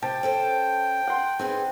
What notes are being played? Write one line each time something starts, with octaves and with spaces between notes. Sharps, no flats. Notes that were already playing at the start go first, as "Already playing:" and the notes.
C3 G5 A5
C#4 A4 C5
F#5 C6
C4 D#4 G#4 B4